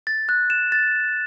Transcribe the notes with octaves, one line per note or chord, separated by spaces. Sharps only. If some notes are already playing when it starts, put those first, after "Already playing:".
A6
F#6
E7
A6